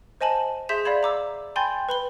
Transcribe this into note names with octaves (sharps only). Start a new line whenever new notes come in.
C5 D#5 G#5 A5 F#7
G#4 E5 C6 G6 B6 E7
D5 F5 B5 G#6
A#5 D6 E6
G5 G#5 B5 C6 G6 A6
B4 B5 G7